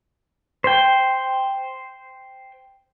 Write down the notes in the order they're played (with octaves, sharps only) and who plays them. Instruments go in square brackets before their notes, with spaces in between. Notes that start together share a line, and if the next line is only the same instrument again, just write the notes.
[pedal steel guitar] C5 G5